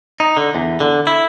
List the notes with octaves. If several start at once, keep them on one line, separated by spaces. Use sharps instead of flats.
D#4
D3
E2
D3
E4